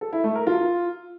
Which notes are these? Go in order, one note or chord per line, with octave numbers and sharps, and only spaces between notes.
A4
E4
A3
A#4
F4